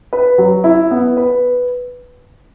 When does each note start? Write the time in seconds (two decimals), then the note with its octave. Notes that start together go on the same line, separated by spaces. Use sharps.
0.13 B4
0.38 F#3
0.64 E4
0.91 B3
1.17 B4